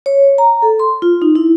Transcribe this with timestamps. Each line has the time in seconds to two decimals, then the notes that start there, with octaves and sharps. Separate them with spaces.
0.06 C#5
0.38 A#5
0.62 A4
0.80 C6
1.02 F4
1.22 D#4
1.35 E4